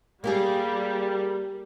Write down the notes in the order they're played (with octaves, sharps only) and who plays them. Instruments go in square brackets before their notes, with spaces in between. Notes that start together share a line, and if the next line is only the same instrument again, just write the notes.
[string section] G3 [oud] A#3 G4 G#4